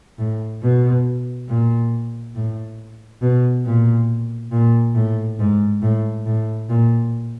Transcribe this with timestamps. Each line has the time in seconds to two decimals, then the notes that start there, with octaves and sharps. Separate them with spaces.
0.19 A2
0.63 B2
1.49 A#2
2.35 A2
3.22 B2
3.65 A#2
4.52 A#2
4.95 A2
5.39 G#2
5.82 A2
6.26 A2
6.69 A#2